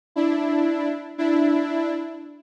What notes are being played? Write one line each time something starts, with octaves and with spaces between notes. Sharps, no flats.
D4 E4
D4 E4